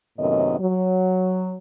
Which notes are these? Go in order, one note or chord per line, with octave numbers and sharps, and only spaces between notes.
F#2 A2 C3 D#3 B3 D#5
F#3